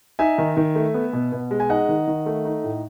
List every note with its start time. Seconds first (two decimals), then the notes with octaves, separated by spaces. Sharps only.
0.19 D#4 E5 G#5
0.38 D#3
0.57 D#3
0.76 A3
0.94 B3
1.13 B2
1.32 B2
1.51 G#3
1.60 G#5
1.69 D#4 D#5 F#5
1.89 D#3
2.07 D#3
2.26 A3
2.45 D#4
2.64 A2